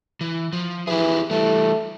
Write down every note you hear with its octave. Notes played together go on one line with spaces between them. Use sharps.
E3
F3
E3 E4 G4 G#4
E3 G3 A3